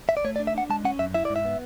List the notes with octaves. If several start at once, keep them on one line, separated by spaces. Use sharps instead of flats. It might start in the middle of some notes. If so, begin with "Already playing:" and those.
E5
D5
A3 C#5
D5
D4
E5
D4 F#5
G#3 A5
C#4 F#5
F#2 E5
E4 E5
G#2 D5
E5
B3